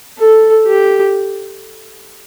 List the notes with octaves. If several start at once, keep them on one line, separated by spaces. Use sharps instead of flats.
A4
G4